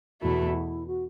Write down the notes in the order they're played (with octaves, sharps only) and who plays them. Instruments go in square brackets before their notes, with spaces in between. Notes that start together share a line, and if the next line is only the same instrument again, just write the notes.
[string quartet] E2 B2 A3 E4 [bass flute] F#4
[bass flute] E4
F#4